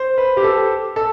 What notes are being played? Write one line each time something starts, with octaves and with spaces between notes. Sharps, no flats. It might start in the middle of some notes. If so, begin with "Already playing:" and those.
Already playing: C5
B4
G4
A4
A4